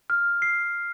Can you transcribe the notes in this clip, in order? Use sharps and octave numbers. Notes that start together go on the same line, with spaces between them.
F6
C7